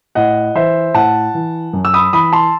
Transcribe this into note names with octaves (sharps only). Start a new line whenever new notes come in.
A2 D#5 F#5
E3 C5 E5
A2 F#5 A5
E3
F#2
E6
B5 D#6
E3 B5 D#6
A5 C6